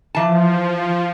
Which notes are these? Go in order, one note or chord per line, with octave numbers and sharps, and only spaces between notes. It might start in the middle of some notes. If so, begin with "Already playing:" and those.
E3 F3 A5